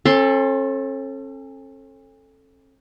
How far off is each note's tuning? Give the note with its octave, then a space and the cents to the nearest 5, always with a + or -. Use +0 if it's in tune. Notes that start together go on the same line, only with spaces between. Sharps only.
C#4 -45 A4 +0 C6 +0